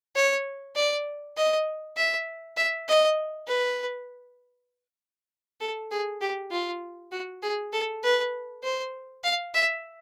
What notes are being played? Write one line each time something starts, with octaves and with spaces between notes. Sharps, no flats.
C#5
D5
D#5
E5
E5
D#5
B4
A4
G#4
G4
F4
F#4
G#4
A4
B4
C5
F5
E5